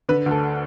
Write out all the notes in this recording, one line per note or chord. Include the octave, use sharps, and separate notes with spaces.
D3 B4
D2 A4